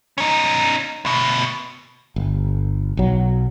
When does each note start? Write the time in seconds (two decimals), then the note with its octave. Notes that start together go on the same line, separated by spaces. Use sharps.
0.18 C#4 D#4
1.05 D2 B2
2.16 G1
2.97 B1 F#3